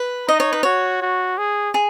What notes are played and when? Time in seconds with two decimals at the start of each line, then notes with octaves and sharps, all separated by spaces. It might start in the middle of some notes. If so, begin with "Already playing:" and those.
Already playing: B4
0.28 D#4 D#5
0.40 C#5
0.53 B4
0.63 F#4 C#5
1.02 F#4
1.38 G#4
1.74 G#4